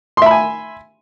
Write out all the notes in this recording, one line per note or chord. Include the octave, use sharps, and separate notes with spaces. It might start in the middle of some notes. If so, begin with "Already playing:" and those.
E5 G#5 B5 C6